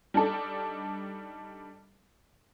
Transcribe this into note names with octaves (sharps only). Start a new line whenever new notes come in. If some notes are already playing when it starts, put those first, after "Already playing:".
G3 D4 D#4 A4 D5